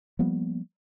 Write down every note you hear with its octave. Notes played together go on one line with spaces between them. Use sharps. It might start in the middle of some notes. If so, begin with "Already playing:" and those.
F3 G3 A#3 B3